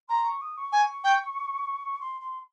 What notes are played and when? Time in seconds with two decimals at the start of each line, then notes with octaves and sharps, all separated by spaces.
0.08 A#5 C6
0.25 C#6
0.42 D#6
0.57 C#6
0.72 G#5
1.04 G5
2.01 C6
2.21 C6